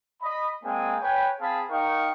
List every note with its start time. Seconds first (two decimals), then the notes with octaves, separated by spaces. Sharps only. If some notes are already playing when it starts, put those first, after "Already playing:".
0.22 D#5 B5
0.64 G#3 A#3 C4 G#5
1.01 B4 C#5 G5 G#5 B5
1.41 C4 G#4 F5 A5 B5
1.69 D#4 A#4 F5 G5 C#6